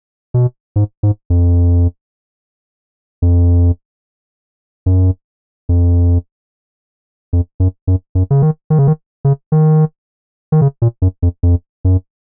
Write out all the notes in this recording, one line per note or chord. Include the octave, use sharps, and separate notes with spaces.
B2
G#2
G#2
F2
F2
F#2
F2
F2
F#2
F#2
F#2
C#3
D#3
D#3
C#3
D#3
C#3
D#3
D#3
C#3
A#2
F#2
F2
F2
F#2